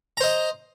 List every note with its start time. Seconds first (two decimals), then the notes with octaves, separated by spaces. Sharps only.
0.17 A#5
0.21 C5
0.24 D#5